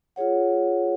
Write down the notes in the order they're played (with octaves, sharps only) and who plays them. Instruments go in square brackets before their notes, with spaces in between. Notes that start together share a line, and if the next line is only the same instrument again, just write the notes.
[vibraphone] F4 G#4 C#5 F#5